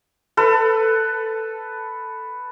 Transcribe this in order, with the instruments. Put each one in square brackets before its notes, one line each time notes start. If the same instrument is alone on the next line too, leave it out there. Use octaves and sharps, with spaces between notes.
[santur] A4 B4